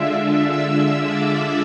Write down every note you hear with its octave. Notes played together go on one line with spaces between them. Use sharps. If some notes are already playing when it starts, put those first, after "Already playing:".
Already playing: D3 G#3 D4 F4 E5 E6
D5 D6